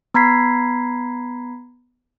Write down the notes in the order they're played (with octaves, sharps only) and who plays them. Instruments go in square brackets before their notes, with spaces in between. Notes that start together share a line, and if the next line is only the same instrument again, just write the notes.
[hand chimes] B3 A#5 B5 G#6 B6 C7